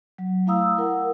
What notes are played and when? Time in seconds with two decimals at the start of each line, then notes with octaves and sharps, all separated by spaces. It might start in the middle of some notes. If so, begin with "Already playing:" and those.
0.18 F#3
0.47 A3 E4 F5 A#5 D#6 E6
0.78 E4 A#4 F#5